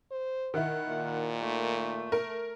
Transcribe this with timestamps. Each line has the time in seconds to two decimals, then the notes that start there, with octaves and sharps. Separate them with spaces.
0.11 C5
0.54 D#3 E4 F#5
0.88 A#2
1.40 A3
2.12 A#4